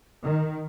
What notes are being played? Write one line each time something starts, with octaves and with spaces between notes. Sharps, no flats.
D#3